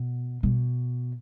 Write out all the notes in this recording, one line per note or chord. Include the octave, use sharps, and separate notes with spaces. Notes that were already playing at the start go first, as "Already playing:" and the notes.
Already playing: B2
B2